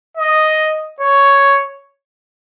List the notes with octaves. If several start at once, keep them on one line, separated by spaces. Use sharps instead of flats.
D#5
C#5